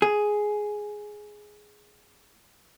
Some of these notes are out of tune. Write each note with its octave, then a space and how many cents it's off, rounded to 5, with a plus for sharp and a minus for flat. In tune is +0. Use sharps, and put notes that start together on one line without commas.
G#4 +5